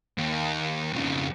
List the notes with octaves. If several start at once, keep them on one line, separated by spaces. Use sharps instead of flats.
D#2
F2 C#3